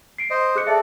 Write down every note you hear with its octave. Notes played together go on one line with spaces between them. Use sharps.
C7 D7
C5 D#5
G#4 F#6 C#7
A4 D5 E5